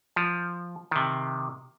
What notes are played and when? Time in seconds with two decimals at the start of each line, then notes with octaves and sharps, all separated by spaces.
0.16 F3
0.91 C3 D#3